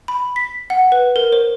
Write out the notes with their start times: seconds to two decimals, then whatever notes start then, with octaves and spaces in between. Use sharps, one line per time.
0.08 B5
0.36 B6
0.70 F#5
0.92 B4
1.16 A#4
1.32 C5